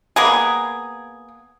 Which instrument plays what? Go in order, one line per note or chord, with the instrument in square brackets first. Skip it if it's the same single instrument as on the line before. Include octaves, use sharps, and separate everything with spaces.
[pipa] A#3 B3 G#4